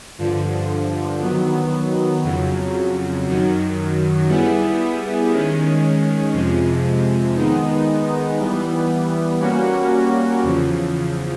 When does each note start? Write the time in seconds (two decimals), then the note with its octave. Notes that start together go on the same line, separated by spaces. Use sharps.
0.18 G2 D3 F3
1.21 D#3 F#3 B3
2.23 F2 C#3 F#3
3.26 F#2 D#3 F#3
4.28 G3 B3 E4 G#4
5.31 D#3 G#3 C#4
6.33 F2 C3 F3 G#3
7.35 D#3 G#3 B3 D#4
8.38 E3 G3 B3
9.40 G3 A#3 C#4 F#4
10.43 E2 C#3 F3